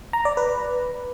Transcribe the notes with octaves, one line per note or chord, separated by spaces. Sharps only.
A#5
D5
B4